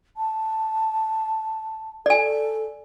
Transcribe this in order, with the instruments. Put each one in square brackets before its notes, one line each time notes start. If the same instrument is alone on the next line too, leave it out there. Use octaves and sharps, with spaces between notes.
[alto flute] A5
[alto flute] A4 [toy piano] D5 G#5